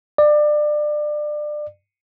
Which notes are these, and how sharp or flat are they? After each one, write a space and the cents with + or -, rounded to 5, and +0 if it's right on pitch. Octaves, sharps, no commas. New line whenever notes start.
D5 +25